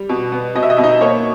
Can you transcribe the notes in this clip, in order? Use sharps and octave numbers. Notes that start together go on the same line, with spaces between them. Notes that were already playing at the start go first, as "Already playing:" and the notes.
Already playing: G3
B2
B3
B2 D#5
E5
D#5
B2 E5
D#4 D#5
A#3 C#5